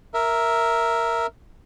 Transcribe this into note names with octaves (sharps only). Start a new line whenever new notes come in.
A#4 E5